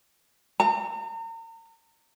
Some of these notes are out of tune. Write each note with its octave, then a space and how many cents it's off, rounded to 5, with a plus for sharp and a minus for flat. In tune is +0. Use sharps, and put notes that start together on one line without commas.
A#5 -40